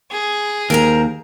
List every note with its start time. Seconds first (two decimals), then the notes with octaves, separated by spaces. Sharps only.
0.11 G#4
0.70 D#2 A#4 C5 A#5